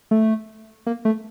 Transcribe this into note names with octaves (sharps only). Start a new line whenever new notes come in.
A3
A#3
A3